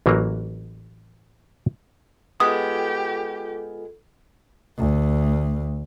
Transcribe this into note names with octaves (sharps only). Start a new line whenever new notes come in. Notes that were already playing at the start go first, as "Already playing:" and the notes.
A1 E3 F#3 A#3 A#5
G#3 B3 F4 G4 A4 D#6
D2